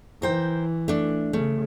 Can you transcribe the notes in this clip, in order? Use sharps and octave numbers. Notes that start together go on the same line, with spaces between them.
E3 A#4 C5 G5
A3 D4
C#3 A3